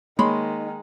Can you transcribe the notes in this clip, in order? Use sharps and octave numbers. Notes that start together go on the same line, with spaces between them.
D#3 G#3 A#3 C#5 B5 C6